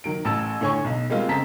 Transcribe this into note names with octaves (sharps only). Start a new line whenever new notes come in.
D#3 F#3 D7
A1 A5 E6
A2 D3 C#5 G#5 C#6
B1 D#4
G3 G#3 A#3 C4 F4
F2 C#3 C4 A5 A#5 B6